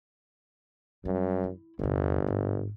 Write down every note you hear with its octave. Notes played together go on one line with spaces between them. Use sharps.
F#2 G3
E4
G1 E2 C3
G#2